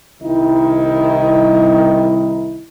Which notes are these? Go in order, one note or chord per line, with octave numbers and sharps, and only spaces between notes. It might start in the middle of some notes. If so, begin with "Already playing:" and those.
C2 D#3 D#4 E4